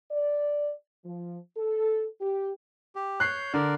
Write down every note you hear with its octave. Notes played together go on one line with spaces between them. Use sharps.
D5
F3
A4
G4
G4
C#5 F#6 G6 C7
D3 A#4 D5